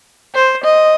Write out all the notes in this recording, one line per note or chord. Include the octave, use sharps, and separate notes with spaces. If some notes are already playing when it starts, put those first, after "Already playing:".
C5
D#5